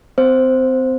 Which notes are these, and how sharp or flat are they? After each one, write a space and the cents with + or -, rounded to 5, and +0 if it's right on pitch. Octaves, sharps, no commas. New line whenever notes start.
C4 -30 C5 +0